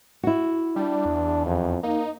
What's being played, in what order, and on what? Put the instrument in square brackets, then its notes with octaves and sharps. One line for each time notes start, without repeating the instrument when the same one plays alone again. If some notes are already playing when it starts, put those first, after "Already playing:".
[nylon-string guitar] E4 F#4
[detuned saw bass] G3 [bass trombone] D4
[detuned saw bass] E2
[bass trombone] F2
[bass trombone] A#3 [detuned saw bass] D#4